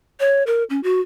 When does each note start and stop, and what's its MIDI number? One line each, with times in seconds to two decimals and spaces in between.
0.20 0.43 73
0.47 0.64 70
0.70 0.81 61
0.83 1.00 66